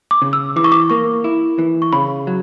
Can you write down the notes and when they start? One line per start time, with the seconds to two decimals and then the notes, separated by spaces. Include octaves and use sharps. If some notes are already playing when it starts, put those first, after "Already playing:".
0.11 D6
0.22 C#3
0.33 E6
0.56 E3 D6
0.64 C#6
0.72 D6
0.90 A#3 C#6
1.24 E4
1.59 E3
1.82 C#6
1.93 C#3 B5
2.27 F#3